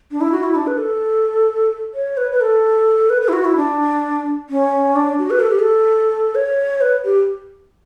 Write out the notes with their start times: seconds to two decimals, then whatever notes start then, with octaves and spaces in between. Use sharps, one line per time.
0.11 D4
0.21 E4
0.32 F#4
0.43 E4
0.55 D4
0.67 B4
0.78 A4
1.94 C#5
2.17 B4
2.31 B4
2.41 A4
3.10 B4
3.22 B4
3.28 E4
3.33 F#4
3.45 E4
3.56 D4
4.49 C#4
4.96 D4
5.19 F#4
5.30 B4
5.40 A4
5.50 G4
5.59 A4
6.35 C#5
6.81 B4
7.04 G4